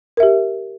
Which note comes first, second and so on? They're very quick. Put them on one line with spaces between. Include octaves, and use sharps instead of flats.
A#4 E5 G4